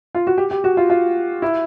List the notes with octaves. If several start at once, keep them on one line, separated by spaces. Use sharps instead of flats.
F4
F#4
G4
G4
F#4
F4
F4
E4